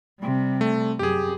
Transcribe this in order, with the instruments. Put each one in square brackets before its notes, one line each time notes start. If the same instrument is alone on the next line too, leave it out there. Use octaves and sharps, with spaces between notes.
[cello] C3 G3
[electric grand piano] A3
[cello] F#2 [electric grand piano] G4 G#4